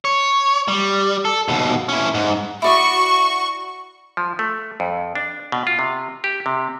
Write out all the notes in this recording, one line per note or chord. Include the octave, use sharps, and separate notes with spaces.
C#5
G3
A4
D#2 B2
C#4 E4
G#2
E4 F#4 D5 C#6 D#6
F3
A3
F2
D4
B2
F4
C3
G4
C3